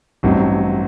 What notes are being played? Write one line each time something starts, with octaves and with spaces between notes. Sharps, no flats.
A1 G2 F#3 C4 D#4